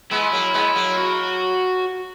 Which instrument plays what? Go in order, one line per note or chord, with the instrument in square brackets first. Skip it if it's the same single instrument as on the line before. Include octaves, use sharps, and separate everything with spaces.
[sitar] G#3 B3 [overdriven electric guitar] E4
[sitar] F#3 A#3
G#3 B3
F#3 A#3
[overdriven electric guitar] F#4